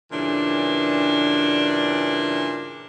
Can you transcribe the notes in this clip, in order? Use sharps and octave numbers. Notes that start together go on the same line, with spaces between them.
G2 A#2 C#3 E3 D4